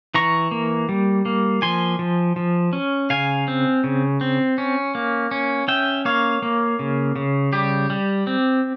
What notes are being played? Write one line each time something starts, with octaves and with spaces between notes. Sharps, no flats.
E3 A#5 C#6
A#3
G3
A#3
F3 G#5 C6
F3
F3
C#4
C#3 F5 G#5
C4
C#3
C4
C#4
A#3
C#4
C#4 E5 G5
A#3 C#5 F5
A#3
C#3
C#3
G3 G4
G3
C4